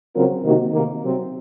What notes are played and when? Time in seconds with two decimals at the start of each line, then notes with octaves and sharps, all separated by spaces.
0.14 C#3 F#3 C4 F4 A#4
0.44 C3 D#3 A#3 D#4 F#4
0.72 C3 D#3 A#3
1.02 C3 F#3 C4